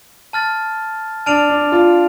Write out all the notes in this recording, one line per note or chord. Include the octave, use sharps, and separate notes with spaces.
A5 F6 A6
D4 A5 F6 D7 F7
D4
F4